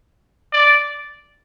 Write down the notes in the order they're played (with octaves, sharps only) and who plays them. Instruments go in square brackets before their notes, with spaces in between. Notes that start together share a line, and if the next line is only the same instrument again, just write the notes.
[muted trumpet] D5